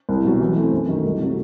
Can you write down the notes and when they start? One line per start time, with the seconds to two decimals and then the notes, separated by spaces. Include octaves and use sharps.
0.09 C2
0.24 B2 F#3
0.41 E3
0.56 A3 C4
0.72 F#2
0.88 D#3 F#3 A3
1.04 C2
1.20 C3 F#3 A3